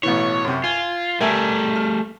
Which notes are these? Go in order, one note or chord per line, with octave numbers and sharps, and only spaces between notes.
A1 B2 E3 C#5
F#2 C3
F4 G#5
G3 A3 A#4 E5 G#5
F6